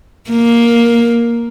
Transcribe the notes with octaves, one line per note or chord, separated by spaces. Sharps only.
A#3